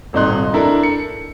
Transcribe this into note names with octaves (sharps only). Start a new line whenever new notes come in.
D#1 G#1 C3 D#4 C6 F#6
D4 E4 A4 A#4
C#7